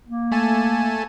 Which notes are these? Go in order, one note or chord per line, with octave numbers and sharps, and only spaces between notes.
A#3
A3 G#5 A5